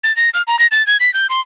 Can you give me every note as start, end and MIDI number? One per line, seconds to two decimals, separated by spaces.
0.04 0.14 93
0.16 0.30 94
0.34 0.42 89
0.47 0.59 82
0.59 0.67 94
0.71 0.85 93
0.87 0.97 92
1.00 1.12 95
1.14 1.27 91
1.30 1.40 84